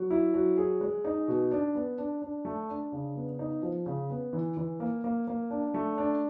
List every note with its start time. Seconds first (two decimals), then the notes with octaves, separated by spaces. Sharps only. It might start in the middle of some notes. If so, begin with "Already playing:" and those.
Already playing: F#3
0.10 E4
0.34 F#3
0.57 G#4
0.81 G#3
1.04 D#4
1.28 B2
1.51 D4
1.75 B3
1.98 D4
2.22 D4
2.45 A3
2.69 D4
2.92 C#3
3.16 B3
3.39 D#4
3.62 F3
3.86 C#3
4.10 B3
4.33 E3
4.57 E3
4.80 A#3
5.04 A#3
5.27 A#3
5.50 D4
5.74 A3
5.98 D4